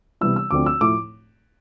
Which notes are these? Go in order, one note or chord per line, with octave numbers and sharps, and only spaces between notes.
C3 E3 G3 B3 E4 E6
E6
D2 D3 F3 A3 C4 D6
E6
A2 F3 A3 E4 D6